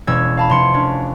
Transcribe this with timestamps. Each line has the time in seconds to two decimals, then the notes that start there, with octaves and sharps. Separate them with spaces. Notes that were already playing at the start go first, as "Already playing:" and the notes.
0.07 E1 C#4 E6 G#6
0.37 F5 A5 B5
0.49 F1 C6 C#7
0.74 C#4 D4